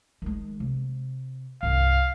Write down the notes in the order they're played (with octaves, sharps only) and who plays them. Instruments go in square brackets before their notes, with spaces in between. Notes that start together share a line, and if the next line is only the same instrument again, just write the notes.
[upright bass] D#3 G#3
C3
[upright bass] C2 G2 [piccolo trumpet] F5